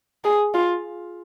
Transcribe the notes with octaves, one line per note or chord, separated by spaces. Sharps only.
G#4
F4